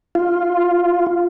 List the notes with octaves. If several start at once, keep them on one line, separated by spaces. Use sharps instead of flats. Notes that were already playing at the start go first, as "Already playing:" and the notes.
F4